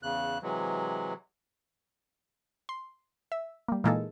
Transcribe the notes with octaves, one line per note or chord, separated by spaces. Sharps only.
E2 C#3 F#6
C3 E3 F#3 G#3
C6
E5
G3 A#3
A#2 E3 G#3 A#3 D#4 A4